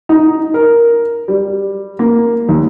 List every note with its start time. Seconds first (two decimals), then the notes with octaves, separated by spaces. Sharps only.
0.09 D#4
0.54 A#4
1.28 G3
1.99 A#3
2.49 D#2